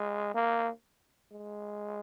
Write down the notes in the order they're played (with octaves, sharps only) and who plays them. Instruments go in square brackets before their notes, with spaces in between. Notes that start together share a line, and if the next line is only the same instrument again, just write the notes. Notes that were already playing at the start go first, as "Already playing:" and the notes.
Already playing: [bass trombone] G#3
A#3
G#3